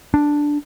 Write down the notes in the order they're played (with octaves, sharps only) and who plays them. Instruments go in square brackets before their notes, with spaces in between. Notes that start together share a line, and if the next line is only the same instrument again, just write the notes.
[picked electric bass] D4